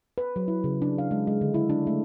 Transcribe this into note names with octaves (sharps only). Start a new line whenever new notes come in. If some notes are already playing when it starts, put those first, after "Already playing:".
B4
F#3
E4
C#3
D4
F5
G#3
G#3
D3
E4
D4
A3